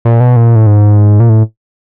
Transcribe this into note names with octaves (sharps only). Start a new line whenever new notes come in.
A#2
B2
A#2
A2
G#2
A#2
A2